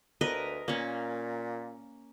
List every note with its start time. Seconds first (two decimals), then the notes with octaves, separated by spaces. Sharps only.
0.21 D2 A#4 B4 D#5
0.68 A#2 A#3 C#4